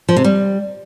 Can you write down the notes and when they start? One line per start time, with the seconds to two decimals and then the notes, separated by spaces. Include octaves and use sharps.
0.09 F3
0.16 C3
0.24 G3